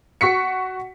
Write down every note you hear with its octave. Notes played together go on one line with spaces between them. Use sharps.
F#4 C#6 B6 C#7